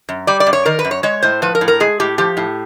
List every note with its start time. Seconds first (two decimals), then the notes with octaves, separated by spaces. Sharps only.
0.09 F#2
0.27 G3 D5
0.40 D5
0.47 F#2
0.53 C#5
0.66 D#3 A#4
0.79 B4
0.84 F#2
0.91 C#5
1.03 G#3 C#5
1.22 A2 C5
1.42 F3 B4
1.55 A#4
1.61 A2
1.68 A#4
1.80 G#3 G#4
2.00 A2 G4
2.18 F3 G4
2.37 A2